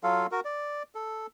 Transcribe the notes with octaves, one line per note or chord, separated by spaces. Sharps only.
F#3 F4 A4 F5
F#4 A#4
D5
A4